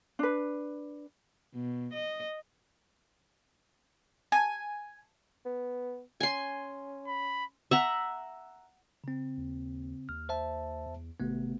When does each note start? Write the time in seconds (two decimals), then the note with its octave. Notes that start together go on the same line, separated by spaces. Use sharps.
0.19 D4 B4
1.54 B2
1.93 D#5
4.32 G#5
5.45 B3
6.20 C#4 G#5 C6
7.07 B5
7.71 E5 F#5 A#5
9.04 C#3 C4
9.37 D#2
10.09 D#2 F6
10.29 C5 E5 A5
10.86 E2
11.20 G#1 C3 A3 B3